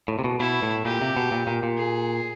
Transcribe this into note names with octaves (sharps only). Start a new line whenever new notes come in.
A2
C3
B2
B2 E4
A2
A#2 G4
C3
B2
A#2
A#2
A#2
G#4